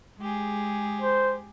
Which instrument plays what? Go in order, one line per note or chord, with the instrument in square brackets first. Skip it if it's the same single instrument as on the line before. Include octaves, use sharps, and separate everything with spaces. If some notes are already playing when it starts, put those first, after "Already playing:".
[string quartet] G#3 G4 G#4
[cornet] C5